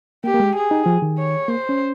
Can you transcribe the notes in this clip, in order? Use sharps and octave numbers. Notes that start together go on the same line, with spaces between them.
A#3 G4
A#3
G#3
G#4
D#4
F3
D#3
C#5
A#3 C5
C#4